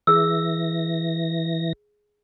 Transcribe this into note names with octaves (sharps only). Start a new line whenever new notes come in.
E3 G#4 E6 A#6